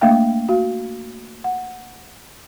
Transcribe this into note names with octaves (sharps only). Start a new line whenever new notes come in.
A3 A#3 D4 E5 F5 G5
F#4 F5
F#5